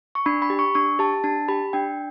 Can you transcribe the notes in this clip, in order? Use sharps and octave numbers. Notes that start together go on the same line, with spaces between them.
C#6
D4 B5
B5
G4
C#6
D4 C#6
G4 A5
D4 A5
G4 B5
D4 G5